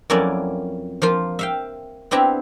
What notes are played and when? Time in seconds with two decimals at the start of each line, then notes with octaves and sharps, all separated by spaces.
0.10 F2 F#3 A#3 C#4 E4 D5
1.02 F3 A#3 F4 C5
1.39 E5 F5 G5
2.11 B3 C4 D4 E4 G4 A#5